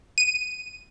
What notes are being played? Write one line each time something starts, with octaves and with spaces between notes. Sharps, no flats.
D#7